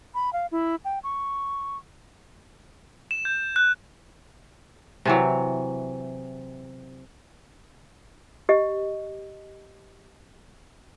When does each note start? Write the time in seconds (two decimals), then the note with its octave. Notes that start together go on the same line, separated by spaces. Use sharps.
0.15 B5
0.33 F5
0.52 E4
0.85 G5
1.04 C#6
3.11 E7
3.25 G6
3.56 F#6
5.05 C3 E3 F#3
8.49 G4 D#5